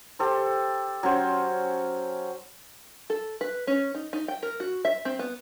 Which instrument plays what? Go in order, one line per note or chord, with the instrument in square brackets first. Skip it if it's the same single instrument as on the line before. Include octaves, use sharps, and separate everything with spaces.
[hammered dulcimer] G4 A4 C5
F#3 C#4 C5
[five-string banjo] A4
B4
C#4
D#4
D#4
G5
A#4
F#4
E5
C4
B3